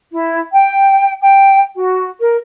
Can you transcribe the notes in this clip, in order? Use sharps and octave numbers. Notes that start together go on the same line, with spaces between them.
E4
G5
G5
F#4
A#4